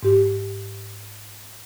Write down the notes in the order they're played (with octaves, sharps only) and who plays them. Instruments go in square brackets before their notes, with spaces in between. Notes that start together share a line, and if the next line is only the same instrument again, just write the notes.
[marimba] G#2 G4